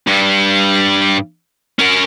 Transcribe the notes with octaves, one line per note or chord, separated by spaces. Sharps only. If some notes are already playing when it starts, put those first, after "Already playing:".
G2 G3
C#4 A#4